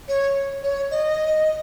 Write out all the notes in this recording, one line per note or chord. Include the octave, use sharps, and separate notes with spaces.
C#5
C#5
D#5